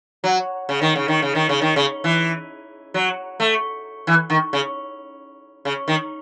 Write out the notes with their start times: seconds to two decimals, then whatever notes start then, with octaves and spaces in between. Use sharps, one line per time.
0.24 F#3
0.69 C#3
0.82 D#3
0.96 C#3
1.08 D#3
1.22 C#3
1.35 D#3
1.49 C#3
1.62 D#3
1.76 C#3
2.04 E3
2.94 F#3
3.40 A3
4.07 E3
4.30 D#3
4.53 C#3
5.65 C#3
5.88 D#3